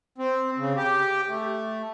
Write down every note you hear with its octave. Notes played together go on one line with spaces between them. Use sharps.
C4
C#3
G4
A3